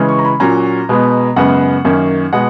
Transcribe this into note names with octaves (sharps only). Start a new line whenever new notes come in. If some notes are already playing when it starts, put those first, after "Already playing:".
Already playing: C#3 E3 G#3 C#4
C#6
A#5
B5
A#2 F#3 C#4 A#5
B2 G#3 B3
F#2 C#3 G#3 B3 F#5
F#2 D#3 A#3 C#4
B2 G#3 B3 F#5